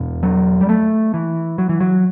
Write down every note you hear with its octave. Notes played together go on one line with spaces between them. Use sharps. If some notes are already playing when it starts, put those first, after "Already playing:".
Already playing: E2 B2
F#3
G3
A3
E3
F#3
E3
F#3